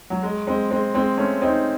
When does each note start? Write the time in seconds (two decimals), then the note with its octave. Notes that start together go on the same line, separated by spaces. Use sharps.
0.10 F#3
0.23 G#3
0.47 G#3 C4
0.71 G#3 C4
0.94 G#3 C4
1.17 A3 C#4
1.42 C4 D#4